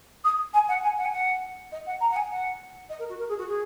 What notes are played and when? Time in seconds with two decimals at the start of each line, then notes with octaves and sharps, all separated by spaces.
0.24 D#6
0.54 G#5
0.68 F#5
0.83 G#5
0.98 F#5
1.05 G#5
1.12 F#5
1.72 D#5
1.86 F#5
2.01 A#5
2.11 F#5
2.16 G#5
2.31 F#5
2.89 D#5
2.99 A#4
3.09 F#4
3.19 A#4
3.29 G#4
3.38 F#4
3.48 G#4